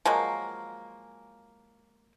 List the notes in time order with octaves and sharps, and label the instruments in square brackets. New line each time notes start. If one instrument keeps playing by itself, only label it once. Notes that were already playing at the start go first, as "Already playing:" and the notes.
[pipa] F3 F#3 G#3 A#3